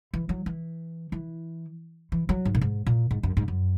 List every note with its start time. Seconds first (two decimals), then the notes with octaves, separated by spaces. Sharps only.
0.14 E3
0.29 F#3
0.46 E3
1.12 E3
2.12 E3
2.29 F#3
2.45 G#2
2.55 A#2
2.61 G#2
2.86 A#2
3.11 G#2
3.23 F#2
3.37 G#2
3.48 F#2